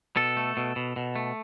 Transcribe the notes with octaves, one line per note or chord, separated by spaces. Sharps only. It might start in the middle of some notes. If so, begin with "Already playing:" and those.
B2 A4
A3
B2
B2
B2
A3